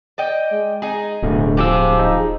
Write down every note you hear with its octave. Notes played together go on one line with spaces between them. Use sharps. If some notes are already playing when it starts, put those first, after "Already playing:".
D5 D#5 G5
G#3
D#4 G#4
D1 B2 D3 A3
F3 G#3 G4 G#4 D6 E6
D#4